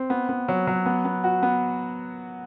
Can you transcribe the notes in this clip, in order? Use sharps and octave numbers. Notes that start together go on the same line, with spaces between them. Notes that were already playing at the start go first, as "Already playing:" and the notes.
Already playing: C4
B3
B3
F#3
F#3
B3
B3
F#4
B3